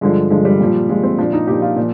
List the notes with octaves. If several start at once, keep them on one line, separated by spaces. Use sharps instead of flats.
G2 D3 F3 G#3
G2 D3 F3 G#3
G3
A#2 F3
A#2 F3 G#3
C4
A#2 F3 D4
D#4
A#2 F3 G4
F4
A#2 F3